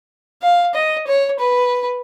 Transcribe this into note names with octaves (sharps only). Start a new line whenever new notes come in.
F5
D#5
C#5
B4